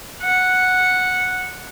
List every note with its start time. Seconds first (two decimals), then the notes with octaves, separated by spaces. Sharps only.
0.22 F#5